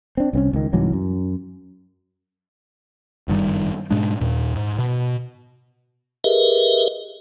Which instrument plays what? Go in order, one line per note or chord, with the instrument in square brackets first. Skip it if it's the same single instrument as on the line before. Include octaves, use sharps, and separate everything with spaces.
[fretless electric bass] C4 D4
C2 C4 C#4
C#2 D#3
C2 G#2 E3 F#3
F#2
[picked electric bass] F#1 G2 D#3 G3
G#2 B2 G#3 D4
D#2 A#2
G#2
B2
[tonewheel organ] G4 G#4 A#4 B4 D#5 E5